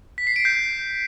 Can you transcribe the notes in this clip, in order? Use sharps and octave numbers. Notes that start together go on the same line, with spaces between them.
B6
C7
D7
G6